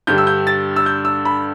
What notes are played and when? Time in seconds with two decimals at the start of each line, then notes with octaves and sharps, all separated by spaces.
0.07 G2 D3 G3 G6
0.18 E6
0.27 G6
0.47 A6
0.76 E6
0.86 G6
1.05 E6
1.25 B5